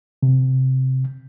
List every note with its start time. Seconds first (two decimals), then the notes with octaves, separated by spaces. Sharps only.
0.23 C3